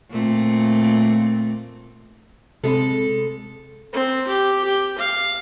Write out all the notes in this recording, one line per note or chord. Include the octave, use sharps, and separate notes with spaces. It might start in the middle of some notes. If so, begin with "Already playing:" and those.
A#2 A3 C4
C3 G#3 C4 A4
C4
G4
G4
F5